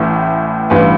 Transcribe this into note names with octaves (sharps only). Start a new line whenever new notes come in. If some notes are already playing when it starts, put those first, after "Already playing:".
Already playing: A1 A2 E3
A1 G2 E3 B4